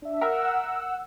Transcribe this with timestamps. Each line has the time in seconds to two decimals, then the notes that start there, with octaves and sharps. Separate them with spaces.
0.02 D4 E5
0.21 A#4 E5 F#5 E6